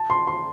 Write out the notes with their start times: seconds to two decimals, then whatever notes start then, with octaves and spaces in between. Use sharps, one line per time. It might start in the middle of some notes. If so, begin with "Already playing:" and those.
Already playing: A5
0.10 C6
0.27 C6